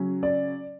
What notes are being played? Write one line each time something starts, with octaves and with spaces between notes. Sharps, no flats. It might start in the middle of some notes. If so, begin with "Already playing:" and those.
Already playing: C#3 F#3 C#4
D5